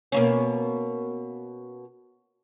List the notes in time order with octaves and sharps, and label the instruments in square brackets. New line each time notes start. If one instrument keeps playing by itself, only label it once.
[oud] B2 A#3 C#4